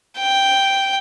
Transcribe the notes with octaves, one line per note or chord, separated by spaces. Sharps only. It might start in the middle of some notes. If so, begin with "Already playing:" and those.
G5